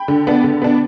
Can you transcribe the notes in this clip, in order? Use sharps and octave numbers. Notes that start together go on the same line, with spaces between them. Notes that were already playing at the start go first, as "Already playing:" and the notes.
Already playing: G5 B5
D3
B3 D4
D3
B3 D4